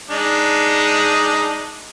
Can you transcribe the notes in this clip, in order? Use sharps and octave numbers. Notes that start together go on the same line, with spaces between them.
G#3 D4 D#4